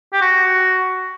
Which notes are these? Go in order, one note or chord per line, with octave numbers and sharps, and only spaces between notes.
G4
F#4